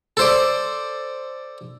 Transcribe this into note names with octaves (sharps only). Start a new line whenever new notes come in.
A4 C5 D5